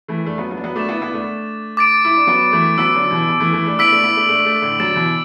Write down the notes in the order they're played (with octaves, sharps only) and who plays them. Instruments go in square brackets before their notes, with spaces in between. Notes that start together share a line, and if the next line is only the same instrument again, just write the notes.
[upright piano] E3 A3
A3 D4
F#3 B3
F#3 B3
D4
F#3 B3
[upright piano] A3 D4 [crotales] D6 A6 E7
[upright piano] B3 E4
B3 E4
A3 D4
[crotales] D6 A6 D7
[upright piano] E4
D4
F#3 B3
E3 A3
[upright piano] F#3 B3 [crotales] E6 B6 D7
[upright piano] D3 F#3
B2 E3
B2
E3 A3
E3 A3
A3 D4
[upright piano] B3 E4 [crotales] E6 B6 D7 F#7
[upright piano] A3 D4
B3 E4
A3 D4
A3 D4
A3 D4
A2 D3
[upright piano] D3 F#3 [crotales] A6 E7
[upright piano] B2 E3